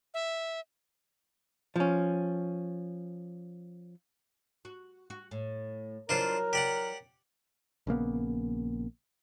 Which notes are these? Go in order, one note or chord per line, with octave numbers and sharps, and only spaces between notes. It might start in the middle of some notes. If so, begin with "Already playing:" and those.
E5
F3 C#4
F#4
F#4
A2
E3 F#3 D4 F4 A#4 C5
G4 D5 F#5
A#1 C#3 A#3 B3